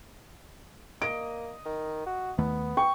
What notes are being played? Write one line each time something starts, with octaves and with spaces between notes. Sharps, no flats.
A#3 D#5 D7
D#3
F#4
D#2 D#3 A3 B3
G5 C#6